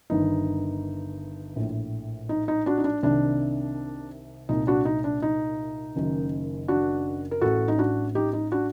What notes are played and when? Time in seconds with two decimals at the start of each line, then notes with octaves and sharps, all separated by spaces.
0.10 G1 G2 D#3 D#4
1.56 A#1 A2
2.29 D#4
2.48 D#4
2.66 D4 F#4
2.77 D#4
2.84 D4
3.03 C2 C3 D#3 D4
4.49 C2 A#2 D#4
4.67 D4 F#4
4.85 D#4
5.04 D4
5.22 D#4
5.96 F#1 F#2 D#3
6.68 D4 F#4
7.31 A#4
7.41 A1 A2 F#4 A4
7.68 D#4
7.78 D4 F#4
8.15 D#4 G4
8.33 D#4
8.52 D4 F#4